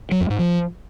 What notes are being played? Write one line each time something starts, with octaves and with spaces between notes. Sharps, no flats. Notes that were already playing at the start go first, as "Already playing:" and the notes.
F#3
F2
G#2
F3